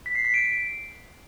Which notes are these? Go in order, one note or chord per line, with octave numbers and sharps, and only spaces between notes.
B6
C7
B6
D7